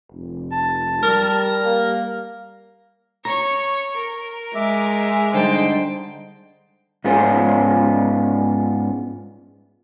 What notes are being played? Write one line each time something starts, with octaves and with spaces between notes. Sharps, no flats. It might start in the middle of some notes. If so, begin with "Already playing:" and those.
F1
A5
G3 A#4
A#3
C#5 A#5 C#6
A#4
G#3 E5 D6
D3 G3 D#4 C5 G5 A5 C6
G#2 B3 C#4 F4 G#4 C5